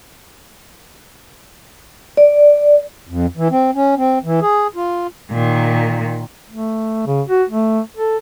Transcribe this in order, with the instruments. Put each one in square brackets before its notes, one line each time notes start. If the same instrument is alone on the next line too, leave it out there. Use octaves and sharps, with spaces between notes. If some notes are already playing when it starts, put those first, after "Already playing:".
[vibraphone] D5
[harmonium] F2
E3
C4
C#4
C4
E3
G#4
F4
[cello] A#2 D#3
[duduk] A3
C#3
F#4
A3
A4